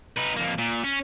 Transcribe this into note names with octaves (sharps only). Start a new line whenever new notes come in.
D#4 B4
F2 A#3
A#2
C#4